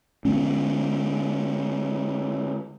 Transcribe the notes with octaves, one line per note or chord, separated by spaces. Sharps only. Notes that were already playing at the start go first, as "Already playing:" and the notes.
D3 G#3 B3 C#4